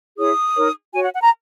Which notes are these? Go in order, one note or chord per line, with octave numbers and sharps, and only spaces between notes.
E4 G#4 C#5 D#6
D#4 A#4 C#5
F#4 C#5 G#5
F#5
F#5
A#5